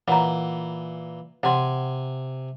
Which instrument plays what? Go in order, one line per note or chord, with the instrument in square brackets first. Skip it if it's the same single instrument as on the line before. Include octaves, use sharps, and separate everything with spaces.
[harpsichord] A#2 E3 [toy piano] F#5 A#5
[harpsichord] C3 G#5 [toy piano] F#5 C6